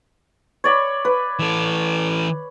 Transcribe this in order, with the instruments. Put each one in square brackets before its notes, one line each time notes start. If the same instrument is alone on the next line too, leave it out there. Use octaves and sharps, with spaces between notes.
[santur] C#5 D5 B5
B4
[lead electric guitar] E3 A4